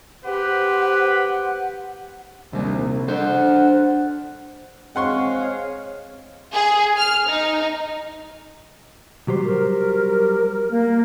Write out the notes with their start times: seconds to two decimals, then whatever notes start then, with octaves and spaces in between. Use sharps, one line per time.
0.24 G4 B4 C5 F#5
2.53 A#1 D#2 C3 G3
3.08 D4 A4 C5 F#5
4.96 G#3 C4 C#5 F5 F#5 C6 C#6
6.52 G#4
6.97 F6
7.27 D#4
9.28 F#3 G3 C5
9.45 A#4
10.71 A#3